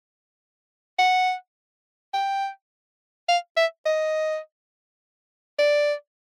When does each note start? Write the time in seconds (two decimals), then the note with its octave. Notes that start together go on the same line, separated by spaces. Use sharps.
0.99 F#5
2.13 G5
3.29 F5
3.57 E5
3.86 D#5
5.59 D5